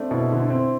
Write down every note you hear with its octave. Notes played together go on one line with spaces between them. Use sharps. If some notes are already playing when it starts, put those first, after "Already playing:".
Already playing: A3 C4 D4
B2 E4
D3
C4